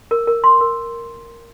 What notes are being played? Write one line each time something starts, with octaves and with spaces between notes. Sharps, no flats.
A#4
A#4
C6
A#4